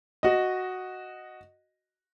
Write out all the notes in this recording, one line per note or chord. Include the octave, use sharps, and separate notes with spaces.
F#4 D#5